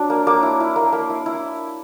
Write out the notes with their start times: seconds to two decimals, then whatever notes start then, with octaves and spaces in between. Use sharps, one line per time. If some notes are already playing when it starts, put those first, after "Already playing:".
Already playing: F#3 D4
0.10 A#3
0.27 A#3 D6
0.43 E4
0.60 E4
0.76 A#3
0.92 A#3
1.10 E4
1.26 E4